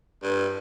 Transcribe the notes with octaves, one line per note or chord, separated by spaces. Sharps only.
G2